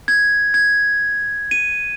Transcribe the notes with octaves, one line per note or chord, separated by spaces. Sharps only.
G#6
G#6
D#7